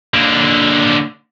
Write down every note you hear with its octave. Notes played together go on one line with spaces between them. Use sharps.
D3 A#3